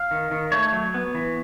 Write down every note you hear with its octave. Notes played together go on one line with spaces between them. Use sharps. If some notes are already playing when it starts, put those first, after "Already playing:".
Already playing: F5
D#3
D#3
A3 C#5
F#3
B3
E3